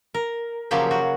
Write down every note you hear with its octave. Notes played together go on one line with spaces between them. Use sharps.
A#4
C#3 F3 F#3 A#3 G4 G5
F#4